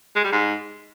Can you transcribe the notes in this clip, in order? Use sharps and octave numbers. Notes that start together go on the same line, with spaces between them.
G#3
G3
G#2